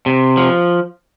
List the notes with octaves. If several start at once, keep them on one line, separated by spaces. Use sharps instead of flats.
C3
F3